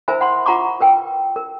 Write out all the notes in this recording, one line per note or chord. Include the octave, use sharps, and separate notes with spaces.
E4 A#4 C5 E5 G#5 B5
F#5 B5 C6
F4 F#5 A#5 B5 C#6 D6
A#4 B4 G5
A#4